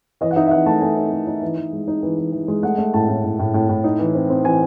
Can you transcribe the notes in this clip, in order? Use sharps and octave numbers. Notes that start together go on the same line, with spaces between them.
E3 D#5
F#5
D#4 E5
E5
E3 F#5
A3 A5
A3 G#5
D#4
A3
D#4
E3
E3
G#3
D#4
E3
E3
E3
G#3
A3 F#5
A3
A2 A5
A2
A2
A2
A2
A2
D#4
E3
C4
C4
E3 G#5